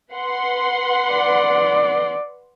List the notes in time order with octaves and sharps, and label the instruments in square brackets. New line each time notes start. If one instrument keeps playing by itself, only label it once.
[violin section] B4 F#5 C6
[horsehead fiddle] D5